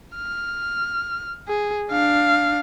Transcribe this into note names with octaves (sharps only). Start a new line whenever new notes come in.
F6
G#4
D4 F5